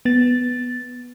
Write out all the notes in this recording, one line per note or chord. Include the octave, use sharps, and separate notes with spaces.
B3 A6